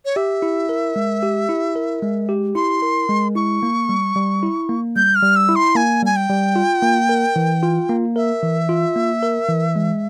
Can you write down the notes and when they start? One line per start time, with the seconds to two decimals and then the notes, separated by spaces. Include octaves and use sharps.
0.05 C#5
0.16 G4 E5
0.42 E4
0.69 A#4
0.96 G#3
1.23 G4
1.49 E4
1.76 A#4
2.02 G#3
2.29 G4
2.55 E4 C6
2.82 A#4
3.09 G#3
3.35 E4 C#6
3.63 A#3
3.89 G3
4.16 G3
4.43 E4
4.69 A#3
4.96 G3 G6
5.15 F6
5.22 G3
5.36 E6
5.49 E4
5.56 C6
5.75 A#3 G#5
6.02 G3 G#5
6.16 G5
6.30 G3
6.56 F4
6.83 A#3
7.09 A#4
7.36 E3
7.63 F4
7.89 A#3
8.16 A#4 E5
8.43 E3
8.69 F4
8.96 A#3
9.23 A#4
9.49 E3
9.76 G#3